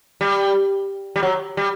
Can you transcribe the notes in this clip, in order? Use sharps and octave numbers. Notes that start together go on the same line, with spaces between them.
G3
G3
F#3
G3